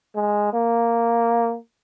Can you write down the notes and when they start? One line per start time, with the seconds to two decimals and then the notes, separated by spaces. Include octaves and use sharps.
0.15 G#3
0.53 A#3